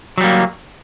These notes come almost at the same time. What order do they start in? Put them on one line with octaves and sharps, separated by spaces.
F#3 G3 A#3